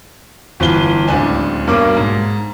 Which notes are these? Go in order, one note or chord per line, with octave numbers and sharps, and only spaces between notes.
G1 E3 F4 B4 G7
D1 C#2 D4 G#5
B1 G2 A#3 D6
G#2